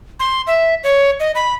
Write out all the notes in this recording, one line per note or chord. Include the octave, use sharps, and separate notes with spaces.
C6
E5
C#5
D#5
B5